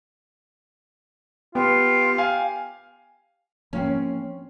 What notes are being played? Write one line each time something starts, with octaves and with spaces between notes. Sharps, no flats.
B3 F4 G4
F5 G#5
F3 A3 A#3 C4 C#4